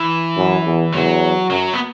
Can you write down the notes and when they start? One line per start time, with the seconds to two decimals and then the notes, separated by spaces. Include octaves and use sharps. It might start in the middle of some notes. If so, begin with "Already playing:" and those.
Already playing: E3
0.36 F#2
0.65 E2
0.94 E2 F#3
1.50 F#2 F#3
1.73 B3